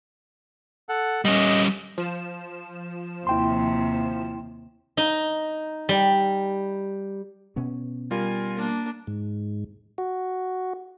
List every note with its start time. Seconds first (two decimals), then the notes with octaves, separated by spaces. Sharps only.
0.89 A4 F#5
1.25 G3 C#4 D#5
1.98 F3 E7
3.27 D#2 C3 E4 G5 C6
4.97 D#4
5.89 G3
7.56 B2 B3 C#4
8.11 G3 F4 A#4 G#5
8.57 A#3 D4
9.07 G#2
9.98 F#4